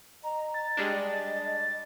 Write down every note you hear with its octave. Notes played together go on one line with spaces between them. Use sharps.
D#5 A#5
A6
G3 G#3 D4 D#5